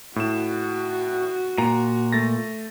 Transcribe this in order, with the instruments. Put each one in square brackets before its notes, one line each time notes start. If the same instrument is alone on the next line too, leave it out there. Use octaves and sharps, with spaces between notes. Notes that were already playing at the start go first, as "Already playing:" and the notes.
[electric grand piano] A2 E7 [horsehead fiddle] F#4
[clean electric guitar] A#2 [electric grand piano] A#5
[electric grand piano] A3 A6 A#6